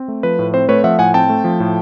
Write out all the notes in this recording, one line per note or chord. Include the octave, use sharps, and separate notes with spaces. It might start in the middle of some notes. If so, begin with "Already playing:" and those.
Already playing: C4
A3
F3 B4
A2
C4 C5
A3 B4 C#5
F3 E5 F#5
A2 F#5 G#5
C4 G5 A5
A3
F3
A2